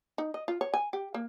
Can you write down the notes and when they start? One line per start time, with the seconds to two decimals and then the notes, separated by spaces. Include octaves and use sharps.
0.18 D#4
0.34 D#5
0.48 F4
0.61 C#5
0.74 G#5
0.93 G4
1.14 A#3